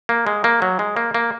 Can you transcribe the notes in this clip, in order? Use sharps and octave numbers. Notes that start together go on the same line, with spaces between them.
A#3
G#3
A#3
F#3
G#3
A#3
A#3